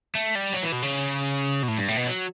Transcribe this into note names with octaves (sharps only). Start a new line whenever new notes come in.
A3
G3
F#3
E3
B2
C#3
B2
A2
G2
A2
B2
F#3